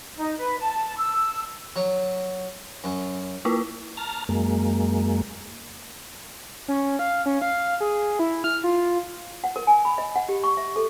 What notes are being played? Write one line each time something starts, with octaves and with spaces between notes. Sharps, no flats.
D#4
B4
A5
E6
F#3
F#2
A#3 E4 F4
A5 A#5 F6
F#2 G#3 A#3
C#4
F5
C#4
F5
G#4
E4
F6
F4
F#5
A#4
G#5
B5
D#5
F#5
G4
C#6
E5
A4